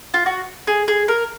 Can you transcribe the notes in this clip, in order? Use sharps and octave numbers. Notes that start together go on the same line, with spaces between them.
F4
F#4
G#4
G#4
A#4